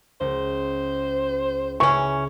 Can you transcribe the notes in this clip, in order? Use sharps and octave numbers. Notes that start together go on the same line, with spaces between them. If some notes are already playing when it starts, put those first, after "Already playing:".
C#2 C5
C#3 E3 C#4 C#6 G#6